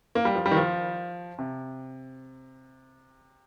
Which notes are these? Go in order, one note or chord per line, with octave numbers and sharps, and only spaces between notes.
A#3
G3
F3
G3
D#3
F3
C3